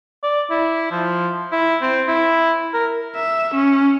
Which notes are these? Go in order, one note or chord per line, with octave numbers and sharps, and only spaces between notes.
D5
E4
F3
E4
C4
E4
A#4
E5
C#4